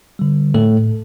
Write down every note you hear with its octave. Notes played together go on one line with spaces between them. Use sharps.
D3 G3
A2 A3 A4